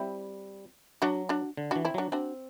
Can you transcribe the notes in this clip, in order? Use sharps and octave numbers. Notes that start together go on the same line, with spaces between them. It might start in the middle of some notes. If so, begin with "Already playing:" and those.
Already playing: G3 C4 E4
F#3 D4 F#4
D4 F#4
D3
E3 D4 F#4
C4 E4
F#3 D4 F#4
C4 D4 F#4